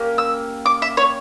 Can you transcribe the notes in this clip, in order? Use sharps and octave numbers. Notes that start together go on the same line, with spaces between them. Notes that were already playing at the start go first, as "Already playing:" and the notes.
Already playing: A#3 C#4 G4
E6
D6
E5
C#5